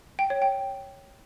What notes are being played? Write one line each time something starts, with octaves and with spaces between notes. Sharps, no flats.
G5
C#5
G5